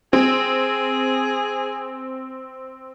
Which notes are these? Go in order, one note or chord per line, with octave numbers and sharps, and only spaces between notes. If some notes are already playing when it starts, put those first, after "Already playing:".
C4 G#4